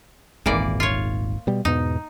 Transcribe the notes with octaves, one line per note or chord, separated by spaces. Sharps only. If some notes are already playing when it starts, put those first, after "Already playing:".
D#1 G#1 G#2 E3 A#3 D5
F4 C#5
B2 G3
E2 G#2 B2 D#4